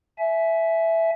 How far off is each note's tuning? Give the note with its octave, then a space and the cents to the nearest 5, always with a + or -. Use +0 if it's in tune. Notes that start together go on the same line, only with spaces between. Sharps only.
E5 +0 G#5 +30